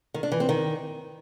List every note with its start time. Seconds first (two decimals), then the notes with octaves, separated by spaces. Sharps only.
0.14 D#3
0.23 D4
0.32 E3
0.40 C4
0.49 D#3